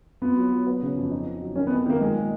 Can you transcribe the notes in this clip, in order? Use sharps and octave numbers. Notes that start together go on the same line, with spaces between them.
B3 F4
F#3
F#3
B3
C#3
F2
D#4
D#4
F#3
D#3 C#4
B3
D#3
B3
D#3 A#3
A#2 G#3
A#2